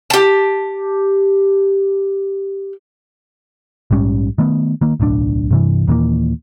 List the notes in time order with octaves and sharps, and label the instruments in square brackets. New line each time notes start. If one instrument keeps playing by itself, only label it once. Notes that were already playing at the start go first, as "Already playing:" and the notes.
[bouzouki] G4 A5
[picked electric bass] A#1 G#2 G3 C#4
D#3 A3 B3
D#3 A#3
D1 B1 A2 D4
G2 C3 E3
D#2 A#2 E3 A#3